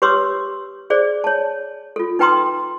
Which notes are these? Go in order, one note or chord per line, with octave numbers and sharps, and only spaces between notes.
G4 B4 C#5 C6 D6 E6
G#4 C5 D5
C#5 A5
F4 A4
D#4 B4 G5 A#5 C6 D#6